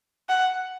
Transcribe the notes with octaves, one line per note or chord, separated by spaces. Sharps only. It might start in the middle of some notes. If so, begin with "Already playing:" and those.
F#5